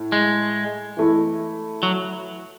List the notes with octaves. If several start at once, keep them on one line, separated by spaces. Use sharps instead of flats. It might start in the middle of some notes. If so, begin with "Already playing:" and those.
Already playing: A2
G#3
E3 A3 E4
F#3